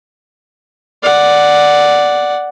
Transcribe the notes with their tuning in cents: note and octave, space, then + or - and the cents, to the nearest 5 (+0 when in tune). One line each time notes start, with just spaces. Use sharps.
D5 +0 F#5 +0